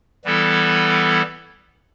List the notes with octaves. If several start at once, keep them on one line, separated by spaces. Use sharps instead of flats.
E3 G3 B3 E4 A4